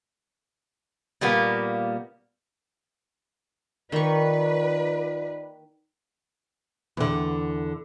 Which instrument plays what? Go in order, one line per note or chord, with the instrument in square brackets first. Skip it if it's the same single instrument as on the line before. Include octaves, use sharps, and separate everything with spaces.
[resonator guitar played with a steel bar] A#2 G3 A#3 B3
[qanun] D#3 C#6 [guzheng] A#3 A#4 [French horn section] D#4 F4 D5 [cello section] B4
[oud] E2 D3